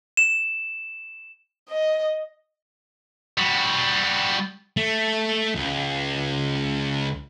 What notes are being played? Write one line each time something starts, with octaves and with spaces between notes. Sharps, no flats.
E7
D#5
G3 F#4
A3
C#2